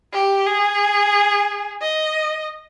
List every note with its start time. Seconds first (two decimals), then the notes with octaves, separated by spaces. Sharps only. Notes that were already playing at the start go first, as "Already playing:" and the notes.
0.13 G4
0.47 G#4
1.81 D#5